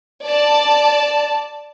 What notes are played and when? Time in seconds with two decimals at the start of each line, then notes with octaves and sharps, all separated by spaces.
0.24 D5 A5